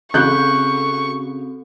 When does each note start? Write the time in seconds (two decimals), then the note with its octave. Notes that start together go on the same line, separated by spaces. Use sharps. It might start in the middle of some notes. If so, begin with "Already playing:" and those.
0.14 C#3 C4 F#4 A4 C#6 F#6 G6